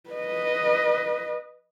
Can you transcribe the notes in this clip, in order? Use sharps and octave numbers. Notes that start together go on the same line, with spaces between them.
B4 D#5